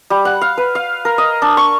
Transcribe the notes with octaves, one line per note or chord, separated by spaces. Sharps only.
G3
F#5
F5
B4
F5
A#4
D#5
D4
C#6